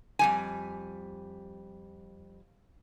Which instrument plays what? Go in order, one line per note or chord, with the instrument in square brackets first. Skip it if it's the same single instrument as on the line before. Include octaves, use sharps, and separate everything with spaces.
[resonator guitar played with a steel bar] F2 G3 G#5